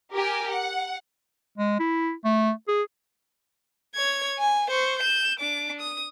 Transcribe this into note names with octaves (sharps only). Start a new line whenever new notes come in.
G4 A#4 G#5
F#5
G#3
E4
A3
G#4
C#5 G#6
G#5
C5 C#6
G6 E7
D4 D6
D#6